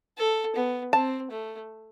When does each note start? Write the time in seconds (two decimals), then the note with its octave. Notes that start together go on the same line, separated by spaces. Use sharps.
0.18 A4
0.56 B3
0.93 C4 A5
1.31 A3